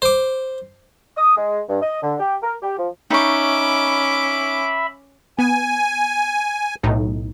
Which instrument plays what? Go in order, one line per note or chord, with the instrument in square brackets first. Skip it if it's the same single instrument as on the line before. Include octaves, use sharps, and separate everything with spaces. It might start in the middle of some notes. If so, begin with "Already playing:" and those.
[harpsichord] C5 D6
[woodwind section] D#6
G#3
G2
D#5
D3
G4
A#4
G4
F3
[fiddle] C#4 D6 [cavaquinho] D#4 C#6 [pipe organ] E5 B5
[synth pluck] B3 [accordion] G#5
[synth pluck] B1 A2 D#4